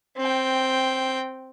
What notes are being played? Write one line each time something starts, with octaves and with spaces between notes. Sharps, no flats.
C4 G5